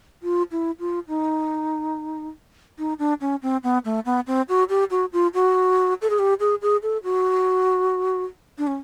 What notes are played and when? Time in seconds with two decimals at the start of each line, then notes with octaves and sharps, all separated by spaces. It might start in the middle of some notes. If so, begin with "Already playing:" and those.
0.23 F4
0.51 E4
0.79 F4
1.08 D#4
2.79 D#4
2.99 D4
3.21 C#4
3.42 C4
3.63 B3
3.85 A3
4.05 B3
4.27 C4
4.49 F#4
4.69 G4
4.90 F#4
5.13 F4
5.34 F#4
6.02 A4
6.10 G#4
6.19 G4
6.40 G#4
6.62 G#4
6.83 A4
7.04 F#4
8.58 D4
8.67 C#4